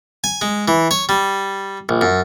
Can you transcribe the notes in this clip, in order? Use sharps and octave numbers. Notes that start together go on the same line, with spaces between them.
G#5
G#3
E3
C#5
G3
A#1
F#2